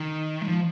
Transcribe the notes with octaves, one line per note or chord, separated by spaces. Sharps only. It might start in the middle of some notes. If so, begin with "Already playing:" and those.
Already playing: D#3
G#3
F3